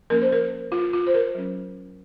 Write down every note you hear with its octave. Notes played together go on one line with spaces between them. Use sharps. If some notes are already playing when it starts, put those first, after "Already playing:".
F3 A#3 C#4 A#4
C5
A#4
F4
F4
C5
A#4
F#3 C#4